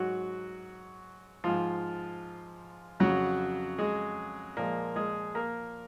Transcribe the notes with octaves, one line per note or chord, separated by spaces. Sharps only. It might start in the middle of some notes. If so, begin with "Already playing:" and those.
Already playing: G#2 F#3 F#4
G#2 F3 G#3 F4
F2 C#3 F#3 F#4
G#3 G#4
A#2 F3 G#3 A#3 A#4
G#3 G#4
A#3 A#4